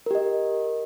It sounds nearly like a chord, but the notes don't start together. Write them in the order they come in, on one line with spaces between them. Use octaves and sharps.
A#4 G4 D#5